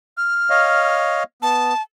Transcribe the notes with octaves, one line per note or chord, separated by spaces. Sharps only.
F6
C#5 D#5 F5
B3 A5